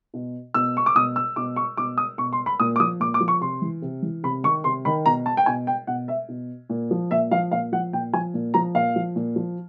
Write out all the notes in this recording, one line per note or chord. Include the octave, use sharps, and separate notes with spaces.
B2
B2 E6
C#6
D6
B2 D#6
E6
B2 D6
C#6
B2 D6
D#6
B2 C#6
C6
B5
A#2 D#6
D6
F3 D#6
A#2 D6
D6
F3
C#6
C3 C6
E3
C3
E3
C3 B5
D#3 C#6
C3 C6
D#3 B5
B2 A#5
A5
G5
B2 G#5
G5
B2 F#5
E5
B2
A#2
F3
A#2 E5
F3 F5
A#2 F5
F3 F#5
A#2 G5
F3 G#5
A#2
F3 A#5
A#2 F5
F3
A#2
F3